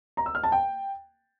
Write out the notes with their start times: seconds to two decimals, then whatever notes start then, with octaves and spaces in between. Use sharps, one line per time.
0.17 A#5
0.26 E6
0.35 F6
0.43 A5
0.52 G5